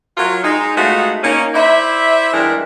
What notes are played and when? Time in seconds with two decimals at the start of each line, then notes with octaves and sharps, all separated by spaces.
0.17 F#3 F4 A#4
0.44 G#3 D#4
0.76 G#3 A3 B3 D#4 F4 F#4
1.24 A#3 C#4 D#4
1.54 E4 C5 D5 E5
2.33 G2 E3 G#3 D4 A#4